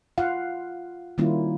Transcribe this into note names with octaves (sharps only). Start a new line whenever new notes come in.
F4 F5 F#5
D#3 G3 A#3 C#4 E4 F4